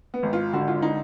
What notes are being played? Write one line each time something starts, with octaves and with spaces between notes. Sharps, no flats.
B3
G#1
F4
D3 F#4
F4
D#4